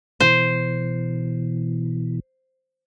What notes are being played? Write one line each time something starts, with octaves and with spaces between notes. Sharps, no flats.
B2 E3 C5